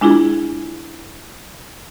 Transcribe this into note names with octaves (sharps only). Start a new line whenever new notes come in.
G#3 D4 E4 F4 G#4